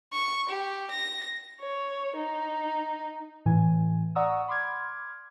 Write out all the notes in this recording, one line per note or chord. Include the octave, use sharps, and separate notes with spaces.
C#6
G4
A#6
C#5
D#4
A2 E3 G#5
D5 F#5 A#5 C#6 D#6 E6
B5 C6 D6 F6 G#6